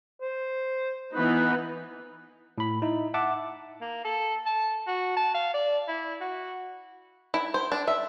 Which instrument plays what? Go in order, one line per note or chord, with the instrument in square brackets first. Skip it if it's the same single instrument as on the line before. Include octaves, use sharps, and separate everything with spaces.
[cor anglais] C5
[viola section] E3 B3 D#4 [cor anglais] B4
[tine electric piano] A2 B5
D#4 E4
E5 F#5 A5 D6
[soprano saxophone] A#3
A4
A5
F#4
A5
F5
D5
E4
F#4
[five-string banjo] E4
C5
D4
E5